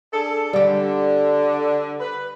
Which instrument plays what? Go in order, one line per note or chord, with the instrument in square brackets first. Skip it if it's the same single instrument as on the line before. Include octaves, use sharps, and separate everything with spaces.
[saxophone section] D4 G#4 A4
[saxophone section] D3 [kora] G3 G4
[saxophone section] B4